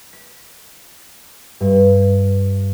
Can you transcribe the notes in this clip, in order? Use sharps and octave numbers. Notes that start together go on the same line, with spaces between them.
B6
G2